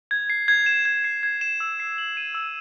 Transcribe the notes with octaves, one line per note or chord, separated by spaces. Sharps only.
G#6
C7
G#6
E7
G#6
C7
G#6
E7
E6
C7
F#7
D#7
E6